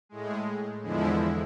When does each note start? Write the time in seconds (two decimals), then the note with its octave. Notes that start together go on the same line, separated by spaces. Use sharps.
0.09 A2 G#3
0.82 E2 D3 F3 G#3 E4